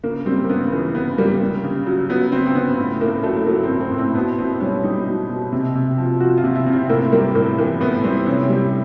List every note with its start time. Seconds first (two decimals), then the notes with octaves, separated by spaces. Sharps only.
0.03 C#3 A#3
0.26 G3 C4
0.44 A#3
0.49 C#3 B3
0.72 E3 A#3
0.94 C#3 B3
1.18 G3 A#3
1.40 C#3
1.64 C#3
1.86 F#3
2.09 F#3 B3
2.32 C#3 C4
2.47 C4
2.55 C#3 B3
2.78 A2
3.01 A2 A#3
3.23 F#3 A3
3.46 F#3 A#3
3.64 C4
3.69 A2
3.81 C4
3.92 A2
3.98 C4
4.15 B2 B3
4.38 B2 C4
4.60 G3 C#4
4.83 G3 D#4
5.07 B2
5.30 B2
5.52 C3
5.75 C3
5.98 F3
6.20 F3 F#4
6.38 F4
6.44 C3
6.55 E4
6.66 C3
6.72 C4
6.89 A2 A#3
7.12 G3 A#3
7.35 A2 A#3
7.59 E3 A#3
7.80 A2 B3
8.04 G3 C4
8.26 C3 C#4
8.49 G3